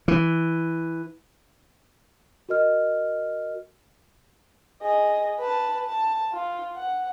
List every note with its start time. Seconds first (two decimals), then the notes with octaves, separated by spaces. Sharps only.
0.08 E3
2.49 F#4 A#4 D#5 F6
4.82 G#4 D#5
5.39 B4 A5
5.86 A5
6.32 F4
6.76 F#5